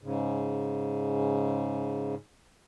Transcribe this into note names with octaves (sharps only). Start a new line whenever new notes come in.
G#2 C#3